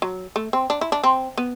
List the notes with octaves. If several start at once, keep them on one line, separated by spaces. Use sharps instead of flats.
F#3
A3
C4
D4
E4
D4
C4
B3